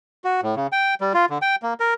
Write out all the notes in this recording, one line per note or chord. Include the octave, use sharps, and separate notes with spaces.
F#4
A2
C#3
G5
G3
F4
D3
G5
A#3
A#4